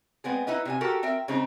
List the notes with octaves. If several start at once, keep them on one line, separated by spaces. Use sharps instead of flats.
G#3 B3 C4 G#4
D#4 E4 B4 D#5
C3 D4 G#5
F#4 G4 A4 A#4
C4 A#4 E5 G5
C#3 G#3 C4 D#4